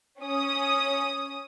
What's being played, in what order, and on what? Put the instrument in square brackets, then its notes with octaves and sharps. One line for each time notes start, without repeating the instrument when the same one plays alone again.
[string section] C#4 D#6